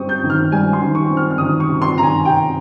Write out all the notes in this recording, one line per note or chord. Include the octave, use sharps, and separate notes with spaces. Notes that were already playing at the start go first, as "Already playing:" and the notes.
Already playing: G3 C4 C#6 D#6
G6
D#3
F6
G3 G#5
C6
D#3
C#6
C4
F6
F6
D#3 D#6
C#6
C3
C6
D#3 A#5
G#5
C3 G5